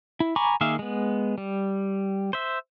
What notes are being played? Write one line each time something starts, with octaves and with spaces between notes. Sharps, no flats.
E4
G#5 A#5 B5 C#6 D6
D#3 A#3 G#4 E5 F5
G#3 B3
G3
C5 E5